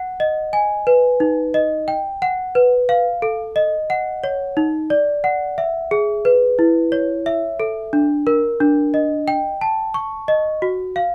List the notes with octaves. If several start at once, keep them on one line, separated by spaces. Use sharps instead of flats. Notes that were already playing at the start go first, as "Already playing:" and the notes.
Already playing: F#5
D#5
G#5
B4
D#4
D#5
G5
F#5
B4
F5
A4
D#5
F#5
C#5
D#4
D5
F#5
E5
G#4
B4
E4
C#5
E5
A4
D4
A#4
D4
D#5
G5
A5
C#6
D#5
F#4
F5